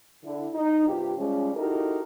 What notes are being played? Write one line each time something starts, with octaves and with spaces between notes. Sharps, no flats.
D3 E4
D#4
G2 C3 F4 G4
F3 G3 G#3 C#4
D#4 E4 F#4 G4 A4 A#4